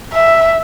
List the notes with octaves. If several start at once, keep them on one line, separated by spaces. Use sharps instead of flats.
E5